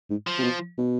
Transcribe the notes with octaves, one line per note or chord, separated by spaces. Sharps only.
G#2
F3
C3
B2
B2